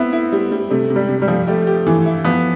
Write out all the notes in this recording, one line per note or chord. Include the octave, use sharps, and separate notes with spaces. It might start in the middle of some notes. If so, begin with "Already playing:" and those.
Already playing: B3 C4 E4
E4
G3
G3
C3 A3
C3
G3
C3
G3
F3
A3 G4
G4
E3
E4
F3 B3